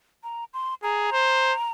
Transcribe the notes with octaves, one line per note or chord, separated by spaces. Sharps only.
A#5
C6
G#4 A#5
C5